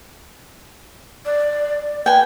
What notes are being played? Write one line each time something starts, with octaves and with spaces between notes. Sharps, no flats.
D5
B4 G5 G#5